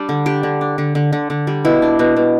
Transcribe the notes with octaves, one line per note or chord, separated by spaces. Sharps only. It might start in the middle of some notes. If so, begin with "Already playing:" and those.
Already playing: G3 D4
D3
D4 G4
D3
D4
D3
D3
D3
D3
G3
B2 E4
D4
B2
B2